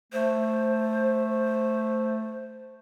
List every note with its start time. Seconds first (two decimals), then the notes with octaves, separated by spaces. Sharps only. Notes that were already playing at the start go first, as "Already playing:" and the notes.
0.13 A3 C5